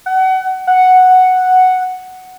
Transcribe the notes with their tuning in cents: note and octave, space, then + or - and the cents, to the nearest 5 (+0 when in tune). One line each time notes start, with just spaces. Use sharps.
F#5 +30
F#5 +0